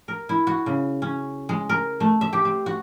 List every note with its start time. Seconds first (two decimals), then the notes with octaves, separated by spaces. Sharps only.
0.08 A#4
0.29 E4
0.47 F#4
0.66 C#3
1.02 C#4
1.49 G#3
1.69 A#4
2.00 A3
2.21 E5
2.33 G4
2.45 C4
2.66 F#4